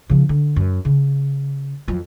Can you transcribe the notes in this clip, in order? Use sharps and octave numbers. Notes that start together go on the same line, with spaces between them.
C#3 F3
D3
F#2
C#3
F2 F#3